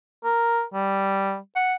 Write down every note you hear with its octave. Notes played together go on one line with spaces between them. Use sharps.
A#4
G3
F#5